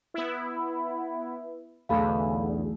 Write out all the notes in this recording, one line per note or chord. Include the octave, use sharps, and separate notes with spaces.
B3 E4
B1 E2 D3 A3 G#4 A4 F5 B5